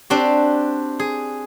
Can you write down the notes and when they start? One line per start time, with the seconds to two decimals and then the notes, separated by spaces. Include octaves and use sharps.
0.10 C4 D4 F#4 G4
1.00 G#4